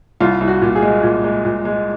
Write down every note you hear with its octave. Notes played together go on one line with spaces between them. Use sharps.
C2 F4
C2
F#4
A#2
G#4
G#3
A#2
G#3
A#2
G#3